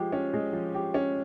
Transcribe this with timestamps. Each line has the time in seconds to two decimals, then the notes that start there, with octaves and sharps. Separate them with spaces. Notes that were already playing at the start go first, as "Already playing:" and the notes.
Already playing: F3 G#3 G4
0.13 C#4
0.34 G#3
0.53 F3
0.74 G4
0.94 C#4